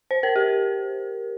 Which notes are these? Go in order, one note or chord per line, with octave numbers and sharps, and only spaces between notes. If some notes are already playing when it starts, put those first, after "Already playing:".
C5
A#4
G4